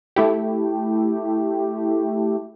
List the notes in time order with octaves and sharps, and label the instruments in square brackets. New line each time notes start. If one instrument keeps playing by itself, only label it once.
[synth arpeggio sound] A3 E4 G4